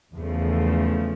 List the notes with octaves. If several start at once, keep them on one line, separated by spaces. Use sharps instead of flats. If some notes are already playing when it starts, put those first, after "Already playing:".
E2 C#3 F3 A3